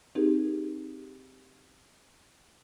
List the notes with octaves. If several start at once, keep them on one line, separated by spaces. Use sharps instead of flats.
C4 D#4 G4 G#4 A#4